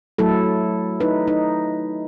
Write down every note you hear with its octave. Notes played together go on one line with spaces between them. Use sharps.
F#3 A3 E4 A4
D#4 E4 B4
D#4